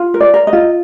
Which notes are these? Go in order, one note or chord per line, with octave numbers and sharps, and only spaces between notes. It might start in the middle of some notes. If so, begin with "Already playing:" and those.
Already playing: F4
A#4
D5
A#4
D#5
F4